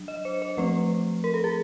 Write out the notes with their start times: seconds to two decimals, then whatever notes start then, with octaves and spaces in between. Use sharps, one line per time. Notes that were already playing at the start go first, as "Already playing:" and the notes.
Already playing: F#3 D4
0.08 D#5
0.25 C5
0.42 C5
0.57 F3 A3 C4 B4
1.24 A#4
1.34 A4
1.44 G#4